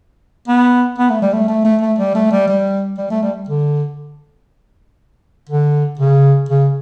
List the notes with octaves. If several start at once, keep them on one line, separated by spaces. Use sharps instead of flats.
B3
B3
A3
G3
A3
A3
A3
A3
G3
A3
G3
G3
G3
A3
G3
D3
D3
C#3
C#3